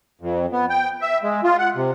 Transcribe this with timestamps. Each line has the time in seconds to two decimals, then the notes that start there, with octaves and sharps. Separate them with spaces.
0.21 F2
0.52 B3
0.70 G5
1.01 E5
1.23 G#3
1.44 F4
1.58 F#5
1.75 C3